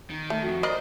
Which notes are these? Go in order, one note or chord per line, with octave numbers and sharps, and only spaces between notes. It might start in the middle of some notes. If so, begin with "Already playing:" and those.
D#3
A3
F2 F#4
A#4 C5 D5 D#5